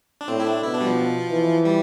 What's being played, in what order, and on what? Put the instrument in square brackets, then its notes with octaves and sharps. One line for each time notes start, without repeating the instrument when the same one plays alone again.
[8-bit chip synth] D4
[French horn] A2 [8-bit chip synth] C4
[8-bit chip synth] E4
D4
[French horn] B2 [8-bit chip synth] E4
[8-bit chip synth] D4
G3
F3
[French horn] E3
[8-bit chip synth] G3